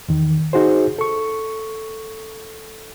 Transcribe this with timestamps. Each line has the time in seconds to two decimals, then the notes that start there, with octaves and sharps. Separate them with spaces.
0.09 E2 D#3
0.53 D#4 F#4 G#4 C5
0.99 A4 C#6